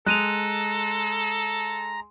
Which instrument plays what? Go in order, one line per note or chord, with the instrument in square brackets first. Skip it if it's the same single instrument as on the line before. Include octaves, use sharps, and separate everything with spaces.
[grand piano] G#3 [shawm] A4 [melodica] A#5 [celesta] F#6 D#7 F7